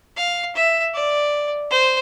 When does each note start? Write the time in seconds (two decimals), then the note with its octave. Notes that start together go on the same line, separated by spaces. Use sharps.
0.17 F5
0.55 E5
0.94 D5
1.71 C5